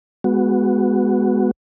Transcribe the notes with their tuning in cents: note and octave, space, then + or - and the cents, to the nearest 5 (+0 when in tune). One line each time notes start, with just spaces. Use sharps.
G#3 +0 B3 +10 F#4 +0